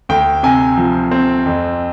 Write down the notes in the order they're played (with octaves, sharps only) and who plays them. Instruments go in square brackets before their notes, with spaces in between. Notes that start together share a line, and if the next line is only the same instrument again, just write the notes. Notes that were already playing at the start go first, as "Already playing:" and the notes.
[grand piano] D2 G5
C3 G#5
F3
C4
F2